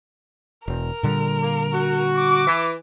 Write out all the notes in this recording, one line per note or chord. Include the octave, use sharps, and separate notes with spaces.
E1 A#4
A#2 D3 G3
A#3
F#4
D6
E3